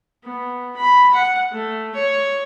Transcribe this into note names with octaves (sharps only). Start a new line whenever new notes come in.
B3
B5
F#5
A3
C#5